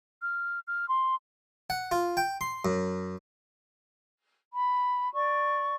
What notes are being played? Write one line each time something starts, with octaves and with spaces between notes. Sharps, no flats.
F6
F6
C6
F#5
F4
G5
C6
F#2
B5
D5 C#6